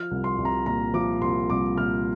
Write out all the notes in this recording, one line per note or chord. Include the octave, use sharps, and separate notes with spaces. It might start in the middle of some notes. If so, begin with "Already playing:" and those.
Already playing: F3 F6
C2
C6
C2
A#5
A#2 A#5
F3 D6
C2 C6
C2 D6
A#2 F6